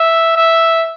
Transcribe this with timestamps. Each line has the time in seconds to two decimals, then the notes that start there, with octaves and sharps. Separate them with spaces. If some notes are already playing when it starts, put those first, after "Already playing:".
Already playing: E5
0.36 E5